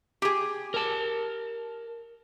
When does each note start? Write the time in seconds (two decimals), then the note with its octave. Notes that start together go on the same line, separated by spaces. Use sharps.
0.22 G4 G#4
0.74 A#4 A5